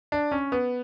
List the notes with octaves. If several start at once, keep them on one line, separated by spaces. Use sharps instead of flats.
D4
C#4
B3